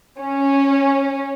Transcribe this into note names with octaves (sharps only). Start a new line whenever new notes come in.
C#4